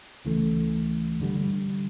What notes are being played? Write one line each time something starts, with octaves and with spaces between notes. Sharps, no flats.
C#2 C#3 E3 A3
G2 D3 G3